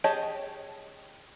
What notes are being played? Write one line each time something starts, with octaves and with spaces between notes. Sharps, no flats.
G4 G#4 C#5 D#5 A5